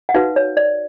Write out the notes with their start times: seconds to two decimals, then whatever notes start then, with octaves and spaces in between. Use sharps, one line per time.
0.09 F#5
0.14 D#4 F#4 B4 F5
0.36 C#5
0.57 D5